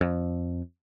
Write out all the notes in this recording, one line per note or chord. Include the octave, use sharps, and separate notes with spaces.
F2